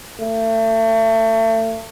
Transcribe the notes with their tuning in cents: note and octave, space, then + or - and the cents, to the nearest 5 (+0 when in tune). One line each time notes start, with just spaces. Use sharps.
A3 +35